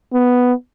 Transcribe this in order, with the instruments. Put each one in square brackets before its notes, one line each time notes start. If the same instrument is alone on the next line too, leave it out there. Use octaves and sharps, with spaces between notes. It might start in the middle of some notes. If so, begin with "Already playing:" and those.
[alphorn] B3